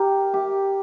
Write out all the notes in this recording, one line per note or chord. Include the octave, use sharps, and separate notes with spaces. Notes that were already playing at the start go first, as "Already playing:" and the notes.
Already playing: G4 A#4
G4